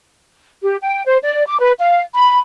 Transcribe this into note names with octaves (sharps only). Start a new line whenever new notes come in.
G4
G5
C5
D5
D6
B4
F5
B5